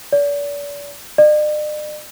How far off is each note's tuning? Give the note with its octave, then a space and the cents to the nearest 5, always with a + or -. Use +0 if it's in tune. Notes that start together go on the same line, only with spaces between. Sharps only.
D5 -40
D5 +45